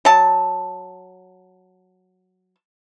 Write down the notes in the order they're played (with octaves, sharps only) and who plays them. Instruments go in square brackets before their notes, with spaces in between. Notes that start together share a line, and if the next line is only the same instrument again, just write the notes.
[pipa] F#3 A5